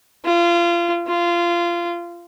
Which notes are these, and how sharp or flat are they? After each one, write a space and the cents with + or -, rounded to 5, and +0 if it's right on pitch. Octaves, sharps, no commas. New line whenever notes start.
F4 -25
F4 -20